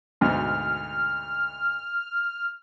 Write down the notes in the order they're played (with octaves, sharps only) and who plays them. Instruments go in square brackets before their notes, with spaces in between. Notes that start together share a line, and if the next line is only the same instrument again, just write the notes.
[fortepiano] D2 G#2 B2 [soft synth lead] F6